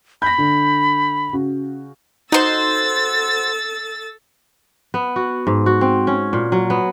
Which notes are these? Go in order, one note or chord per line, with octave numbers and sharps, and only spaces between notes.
B5 G6 A#6
D3
C#3 F#4
D#4 F#4 A4 C5 E6 A6 E7
B3
F#4
G#2
F#4
C4
C#4
A#2
F#3
B3